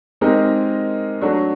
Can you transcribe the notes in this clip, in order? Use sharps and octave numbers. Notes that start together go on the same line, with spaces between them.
G#3 C4 D#4 G4 A#4
F#3 A3 D4 F#4